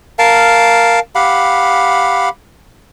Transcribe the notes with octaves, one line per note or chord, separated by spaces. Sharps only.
A#4 F5 A5
G4 F5 F#5 B5